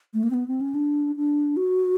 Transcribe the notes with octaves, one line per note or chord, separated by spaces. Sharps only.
A3
A#3
C4
B3
C4
C#4
D4
D4
F#4